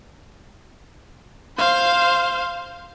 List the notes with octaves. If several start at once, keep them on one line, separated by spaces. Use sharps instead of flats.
C5 F5